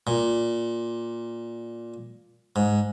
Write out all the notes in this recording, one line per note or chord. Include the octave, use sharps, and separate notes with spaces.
A#2
G#2